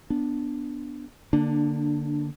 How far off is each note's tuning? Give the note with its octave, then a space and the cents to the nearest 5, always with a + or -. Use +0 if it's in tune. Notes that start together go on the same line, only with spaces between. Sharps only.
B3 +0 D4 +0
D3 +0 A#3 +0 D4 +20